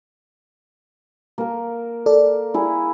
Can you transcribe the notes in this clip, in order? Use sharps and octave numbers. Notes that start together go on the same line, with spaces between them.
A#3 A#4
A4 D5
E4 G#4